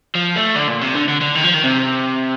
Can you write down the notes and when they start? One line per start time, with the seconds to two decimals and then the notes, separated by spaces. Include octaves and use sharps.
0.15 F3
0.36 A3
0.55 D3
0.68 A#2
0.81 C3
0.95 D3
1.08 D3
1.21 D3
1.35 D#3
1.44 F3
1.54 D#3
1.64 C3